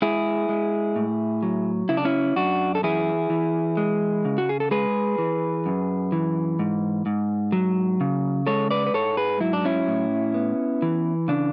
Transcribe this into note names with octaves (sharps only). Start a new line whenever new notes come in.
G#3 E4 G#4
G#3
A2
F#3
C#3 E4
D4
C#4 E4
F#2 D4 F#4
A4
E3 E4 G#4
E3
G#3
C#3
F#4
G#4
A4
G#3 G#4 B4
E3
F#2
E3
G#2
G#2
F#3
C#3
G#3 A4 C#5
B4 D5
B4
G#2 A4 C#5
G#4 B4
F#3 E4
D4
C#4 E4
A2
B3
E3
C#3 D4